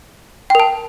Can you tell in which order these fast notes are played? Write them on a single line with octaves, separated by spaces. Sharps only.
G5 A#4 A5